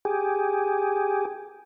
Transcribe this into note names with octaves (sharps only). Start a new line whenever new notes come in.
G4 G#4